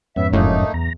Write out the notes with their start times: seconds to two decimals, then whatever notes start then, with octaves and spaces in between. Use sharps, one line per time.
0.16 F2 G#2 B3 C#4 E5
0.33 F1 F#2 A2 A3 A#3 D#4
0.74 E2 A#5